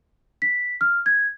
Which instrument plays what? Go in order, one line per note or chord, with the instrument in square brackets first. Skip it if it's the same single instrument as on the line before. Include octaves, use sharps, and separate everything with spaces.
[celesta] B6
F6
G#6